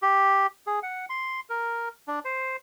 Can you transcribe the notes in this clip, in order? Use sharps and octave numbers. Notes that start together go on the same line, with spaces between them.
G4
G#4
F#5
C6
A#4
D4
C5